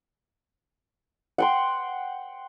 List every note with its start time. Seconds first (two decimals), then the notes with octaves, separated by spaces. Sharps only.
1.38 F#5 G5 C6